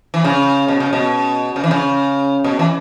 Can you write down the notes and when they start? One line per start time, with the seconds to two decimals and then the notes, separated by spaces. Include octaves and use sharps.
0.14 E3
0.24 C#3
0.68 B2
0.80 C#3
0.93 B2
1.56 C#3
1.64 E3
1.71 C#3
2.44 B2
2.59 E3